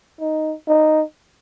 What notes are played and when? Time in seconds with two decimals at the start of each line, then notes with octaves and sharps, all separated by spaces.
0.21 D#4
0.68 D#4